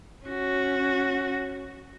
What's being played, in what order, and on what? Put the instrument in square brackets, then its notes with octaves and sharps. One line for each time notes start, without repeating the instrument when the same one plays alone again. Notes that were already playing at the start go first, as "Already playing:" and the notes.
[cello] C#4 F#4